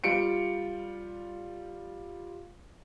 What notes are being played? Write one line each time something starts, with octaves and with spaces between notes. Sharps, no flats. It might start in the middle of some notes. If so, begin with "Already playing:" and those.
G3 F4 C#7 D7